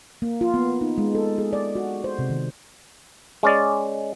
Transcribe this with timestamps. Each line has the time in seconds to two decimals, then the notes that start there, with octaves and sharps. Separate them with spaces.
0.22 A#3
0.41 F4
0.54 B3
0.81 D#4
0.98 G#3
1.15 A4
1.38 G#4
1.53 D5
1.76 F#4
2.04 C5
2.19 C3
2.30 D#3
3.43 G#3 C#4 D5